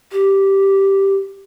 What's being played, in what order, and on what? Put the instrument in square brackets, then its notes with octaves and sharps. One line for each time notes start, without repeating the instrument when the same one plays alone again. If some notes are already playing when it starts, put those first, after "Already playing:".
[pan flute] G4